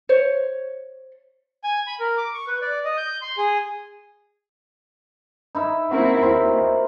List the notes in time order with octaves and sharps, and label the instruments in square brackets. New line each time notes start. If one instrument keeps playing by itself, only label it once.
[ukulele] C5 C#5
[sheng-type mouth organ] G#5
B5
A#4
D6
C#6
B4
D5
D#5
G6
C6
G#4
[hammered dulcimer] D#4 E4 E5
[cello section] A#3 C4 E4 [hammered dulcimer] F#4 A#4
[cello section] D#2 [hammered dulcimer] C4 C5